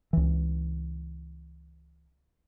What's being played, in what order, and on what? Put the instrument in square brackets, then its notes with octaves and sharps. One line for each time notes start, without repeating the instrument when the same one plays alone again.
[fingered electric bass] C#2 E3